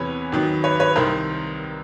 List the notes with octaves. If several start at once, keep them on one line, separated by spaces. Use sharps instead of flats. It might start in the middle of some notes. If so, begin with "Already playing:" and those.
Already playing: E2 C3 E3 B4 C#5
D#2 D#3 F#3
B4 C#5
B4 C#5
C2 C3 D#3 A#4 C5